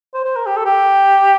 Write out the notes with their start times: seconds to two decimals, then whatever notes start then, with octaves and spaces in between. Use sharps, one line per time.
0.14 C5
0.25 C5
0.36 A#4
0.47 G4
0.57 A4
0.66 G4